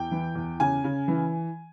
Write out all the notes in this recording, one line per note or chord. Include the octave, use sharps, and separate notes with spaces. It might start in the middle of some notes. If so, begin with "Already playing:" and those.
Already playing: E2 G5
E3
E2
C#3 G#5
C#3
E3